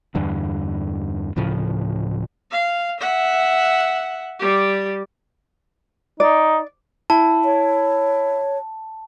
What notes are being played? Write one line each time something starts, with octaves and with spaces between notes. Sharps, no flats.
E2 G2 D3
D1 A2 C#3 F3
F5
E5 F#5
G3 G4
D#4 D5
E4 A5
C#5